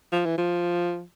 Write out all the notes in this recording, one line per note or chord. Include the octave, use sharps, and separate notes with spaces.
F3
E3
F3